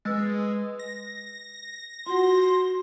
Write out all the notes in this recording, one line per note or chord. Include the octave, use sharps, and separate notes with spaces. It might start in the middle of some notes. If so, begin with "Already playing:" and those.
G#3 B4 E6 A6
A#6
F4 F#4 F#5 C6